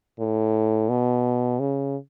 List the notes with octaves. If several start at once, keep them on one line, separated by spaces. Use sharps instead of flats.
A2
B2
C#3